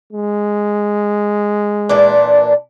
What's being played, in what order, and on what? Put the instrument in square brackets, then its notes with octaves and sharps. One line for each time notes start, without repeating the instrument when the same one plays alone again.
[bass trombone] G#3
[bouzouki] A#2 E3 D4